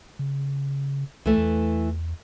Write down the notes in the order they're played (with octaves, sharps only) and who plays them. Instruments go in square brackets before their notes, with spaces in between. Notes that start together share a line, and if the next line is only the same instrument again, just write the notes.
[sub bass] C#3
[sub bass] C#2 [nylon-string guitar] E3 A3
[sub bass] E2